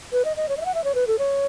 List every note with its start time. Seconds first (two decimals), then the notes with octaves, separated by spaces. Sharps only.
0.13 B4
0.25 D#5
0.37 D#5
0.49 C#5
0.57 D#5
0.61 E5
0.65 F#5
0.75 E5
0.84 C#5
0.95 B4
1.07 A4
1.19 C#5